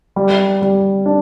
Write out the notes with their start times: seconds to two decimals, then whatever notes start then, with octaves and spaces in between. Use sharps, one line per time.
0.16 G3
0.62 G3
1.06 D4